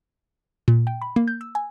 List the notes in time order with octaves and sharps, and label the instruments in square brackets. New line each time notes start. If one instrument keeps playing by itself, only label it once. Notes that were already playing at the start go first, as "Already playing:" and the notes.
[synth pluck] A#2
G5
B5
A#3
G6
E6
G#5